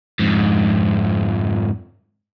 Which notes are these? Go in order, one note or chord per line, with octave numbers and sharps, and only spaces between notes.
F2 G#2